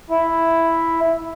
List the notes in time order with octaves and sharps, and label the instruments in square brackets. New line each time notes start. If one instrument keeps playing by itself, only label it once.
[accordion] E4